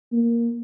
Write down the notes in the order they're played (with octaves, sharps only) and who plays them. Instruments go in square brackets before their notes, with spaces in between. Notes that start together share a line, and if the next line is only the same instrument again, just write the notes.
[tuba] A#3